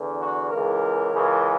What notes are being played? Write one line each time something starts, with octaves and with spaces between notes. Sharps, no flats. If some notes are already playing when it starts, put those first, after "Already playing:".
Already playing: E2 D3
F#4
C#2 C#3 E3 A#4
C#2 C#3 E3